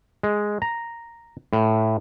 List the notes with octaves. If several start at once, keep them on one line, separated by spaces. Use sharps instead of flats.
G#3
A#5
A2